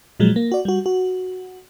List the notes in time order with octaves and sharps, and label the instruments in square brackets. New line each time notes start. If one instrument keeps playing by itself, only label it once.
[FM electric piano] A#2 F3 F#3 G#3
A#3
F#4 D5
G3 F#4
F#4